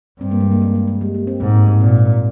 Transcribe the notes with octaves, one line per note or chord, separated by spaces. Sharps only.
G2 C4
A#3
G#3
A#3
A#3
G#3
G#3
G3
A#3
C4
G#2 C4
A#3
G#3
A#2 C4